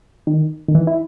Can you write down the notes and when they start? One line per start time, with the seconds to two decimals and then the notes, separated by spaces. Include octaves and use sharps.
0.27 D#3
0.68 D#3
0.75 E3
0.87 E4